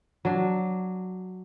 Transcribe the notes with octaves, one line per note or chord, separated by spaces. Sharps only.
F#3 D4